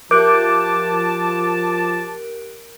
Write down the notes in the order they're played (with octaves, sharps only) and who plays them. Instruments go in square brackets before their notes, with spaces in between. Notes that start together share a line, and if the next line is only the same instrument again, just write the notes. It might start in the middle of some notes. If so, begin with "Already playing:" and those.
[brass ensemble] F3 A5 [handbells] G4 F#6 G6 [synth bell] A#4 D7 [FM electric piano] D6